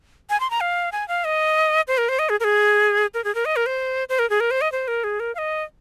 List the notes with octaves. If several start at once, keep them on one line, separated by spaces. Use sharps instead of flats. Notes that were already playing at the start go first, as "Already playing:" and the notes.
G#5
C6
A#5
F5
G#5
F5
D#5
C5
A#4
C5
D#5
G#4
A#4
G#4
A#4
G#4
A#4
D#5
A#4
C5
C5
A#4
G#4
A#4
C5
D#5
C5
A#4
G#4
A#4
F5
D#5